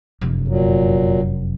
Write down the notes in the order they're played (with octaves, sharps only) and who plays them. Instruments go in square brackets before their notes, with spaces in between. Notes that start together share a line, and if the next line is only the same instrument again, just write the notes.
[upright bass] F1 F#2
[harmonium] A#2 F#3